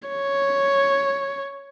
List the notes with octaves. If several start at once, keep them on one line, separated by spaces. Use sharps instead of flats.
C#5